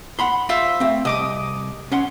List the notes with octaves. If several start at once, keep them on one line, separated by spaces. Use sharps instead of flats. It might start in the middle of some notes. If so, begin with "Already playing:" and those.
F#5 B5 C6
F4 C5 E5
A3 C4
C2 D#5 D6 D#6
C#4 F#5 C6